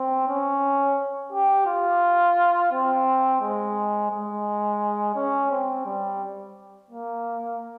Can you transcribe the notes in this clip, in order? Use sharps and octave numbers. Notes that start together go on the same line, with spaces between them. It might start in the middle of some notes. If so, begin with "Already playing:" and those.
Already playing: C4
C#4
G4
F4
C4
G#3
G#3
C#4
C4
G3
A#3